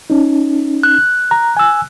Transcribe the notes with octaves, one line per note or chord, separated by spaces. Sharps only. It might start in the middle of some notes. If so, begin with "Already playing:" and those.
C#4 D#4
F#6
A#5
G#5 E6